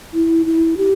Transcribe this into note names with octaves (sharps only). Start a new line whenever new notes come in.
E4
E4
G4